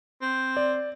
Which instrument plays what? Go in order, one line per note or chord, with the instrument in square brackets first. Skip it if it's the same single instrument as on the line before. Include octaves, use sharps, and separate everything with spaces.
[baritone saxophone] C4
[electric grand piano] D5